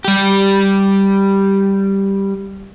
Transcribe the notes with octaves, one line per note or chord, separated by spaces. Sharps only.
G3 G4